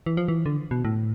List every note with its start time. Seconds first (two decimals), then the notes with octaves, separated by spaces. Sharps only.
0.06 E3
0.17 F3
0.28 E3
0.46 D3
0.71 B2
0.85 A2